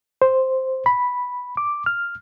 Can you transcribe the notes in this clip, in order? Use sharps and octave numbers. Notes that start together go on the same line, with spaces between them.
C5
B5
D6
F6